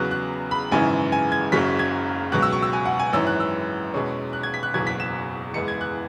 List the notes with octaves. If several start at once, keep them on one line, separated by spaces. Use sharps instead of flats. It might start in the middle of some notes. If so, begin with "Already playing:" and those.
Already playing: E2 C#3 F#3 B3 F#6
F#6
B5
G#1 F#2 C#3 E3 G#5
G#5
G#6
F#1 F#2 C#3 F#3 B6
G#6
C#2 B2 F#3 F#6
E6
C#6
E6
G#5
F#5
G#5
G#1 F#2 E3 C#4 E6
F#6
E6
E2 B2 G#3 C#4
F#6
G#6
B6
F#6
F#1 E2 B2 F#3 G#6
B6
E7
F#1 E2 E3 G#3 B3 C#7
G#6
F#6